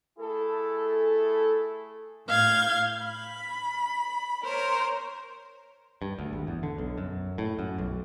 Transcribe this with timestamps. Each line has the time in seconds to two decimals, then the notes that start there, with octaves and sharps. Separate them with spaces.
0.19 A3 E4 G#4 A4
2.27 A2 F5 G6 G#6
3.04 B5
4.43 A#4 C5 C#5
6.02 G2
6.19 D2
6.33 G#1
6.47 E2
6.63 D3
6.78 B1
6.98 F#2
7.38 A2
7.59 F#2
7.78 B1